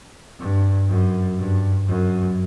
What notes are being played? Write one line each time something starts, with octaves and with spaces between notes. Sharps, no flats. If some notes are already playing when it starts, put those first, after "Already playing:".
G2
F#2
G2
F#2